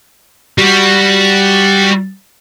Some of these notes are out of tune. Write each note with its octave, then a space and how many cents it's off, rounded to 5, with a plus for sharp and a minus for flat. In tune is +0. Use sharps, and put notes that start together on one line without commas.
G3 +0 F#4 +0